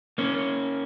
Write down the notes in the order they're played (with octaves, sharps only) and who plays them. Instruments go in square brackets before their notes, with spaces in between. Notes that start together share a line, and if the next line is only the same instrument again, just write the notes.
[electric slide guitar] A#3 C#4